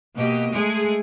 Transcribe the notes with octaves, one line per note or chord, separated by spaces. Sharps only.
B2 A#3 G4 D#5
G#3 A3 G#4